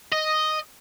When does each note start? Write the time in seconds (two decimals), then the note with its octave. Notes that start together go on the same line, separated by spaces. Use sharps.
0.12 D#5